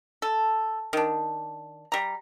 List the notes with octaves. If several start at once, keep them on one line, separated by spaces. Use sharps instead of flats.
A4
D#3 D4
G3 A#5